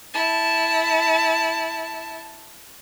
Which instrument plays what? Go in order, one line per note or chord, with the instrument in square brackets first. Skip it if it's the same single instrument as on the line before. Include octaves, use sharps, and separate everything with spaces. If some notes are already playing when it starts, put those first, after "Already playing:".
[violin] E4 A5